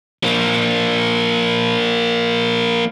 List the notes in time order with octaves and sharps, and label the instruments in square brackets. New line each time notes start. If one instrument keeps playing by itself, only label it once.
[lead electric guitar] F3 A#3